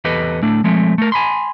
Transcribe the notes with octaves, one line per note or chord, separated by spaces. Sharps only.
E2 G4 A4 B4 D#5
A2 A3 D4
F3 G#3 A3 C4
A3 A#4
G#5 B5 C6